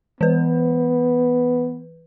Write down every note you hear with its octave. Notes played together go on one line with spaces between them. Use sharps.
E3 B3 B4